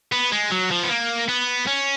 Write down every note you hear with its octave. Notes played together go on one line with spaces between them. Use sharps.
B3
G#3
F#3
F3
B3
A#3
B3
C#4